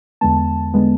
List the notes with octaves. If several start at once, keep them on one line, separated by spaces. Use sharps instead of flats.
E2 D3 G#3 B3 A5
D3 G#3 B3